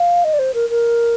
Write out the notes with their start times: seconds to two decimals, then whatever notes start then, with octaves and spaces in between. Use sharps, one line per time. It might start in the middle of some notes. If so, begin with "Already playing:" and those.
Already playing: F5
0.24 D#5
0.34 D5
0.39 C5
0.54 A#4
0.70 A#4